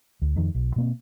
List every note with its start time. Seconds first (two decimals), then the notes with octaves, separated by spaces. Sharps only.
0.22 D2
0.36 F2 D#3
0.55 B1
0.76 B2 A#3 C4